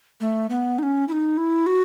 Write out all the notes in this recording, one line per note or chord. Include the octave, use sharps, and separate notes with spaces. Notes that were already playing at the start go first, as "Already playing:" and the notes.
A3
B3
D#4
C#4
E4
D#4
E4
F#4